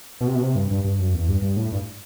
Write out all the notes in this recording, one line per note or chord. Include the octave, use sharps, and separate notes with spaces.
B2
C3
B2
C3
G2
G2
G2
F#2
E2
G2
G2
A2
G2